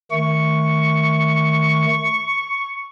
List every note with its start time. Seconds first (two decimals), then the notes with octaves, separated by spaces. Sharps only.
0.12 D#3 A3 C#6